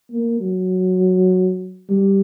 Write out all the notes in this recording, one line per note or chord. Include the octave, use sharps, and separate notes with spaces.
A#3
F#3
G3